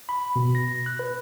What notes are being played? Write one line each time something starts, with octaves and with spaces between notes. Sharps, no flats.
B5
B2
A#6
F#6
B4